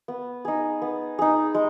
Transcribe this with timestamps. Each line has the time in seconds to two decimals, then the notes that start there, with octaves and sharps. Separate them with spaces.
0.08 B3
0.45 D#4 G#4
0.82 B3
1.19 D#4 G#4
1.55 G#3